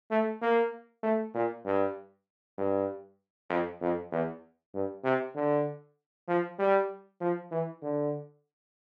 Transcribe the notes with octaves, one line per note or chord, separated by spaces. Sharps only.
A3
A#3
A3
A#2
G2
G2
F2
F2
E2
G2
C3
D3
F3
G3
F3
E3
D3